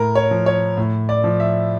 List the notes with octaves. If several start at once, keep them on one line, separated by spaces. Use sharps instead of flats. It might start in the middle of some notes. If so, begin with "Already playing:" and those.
Already playing: A2 A#4
C#5
F3
C#5
A2
D5
F3
E5